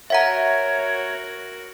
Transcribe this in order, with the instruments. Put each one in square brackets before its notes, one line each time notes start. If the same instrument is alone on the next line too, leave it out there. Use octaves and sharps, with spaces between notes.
[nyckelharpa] F#4 A#4 [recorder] C#5 [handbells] E5 F#5 A#5